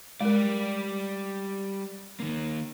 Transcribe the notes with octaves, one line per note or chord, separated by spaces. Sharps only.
G3 G#3 A#4 D5
D#3 A#3